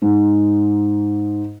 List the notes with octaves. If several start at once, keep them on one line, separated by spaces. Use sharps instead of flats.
G#2